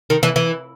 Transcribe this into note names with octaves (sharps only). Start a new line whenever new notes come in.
D#3
E3
E3